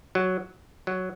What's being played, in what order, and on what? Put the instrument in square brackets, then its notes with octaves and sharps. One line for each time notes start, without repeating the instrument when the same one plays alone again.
[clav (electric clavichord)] F#3
F#3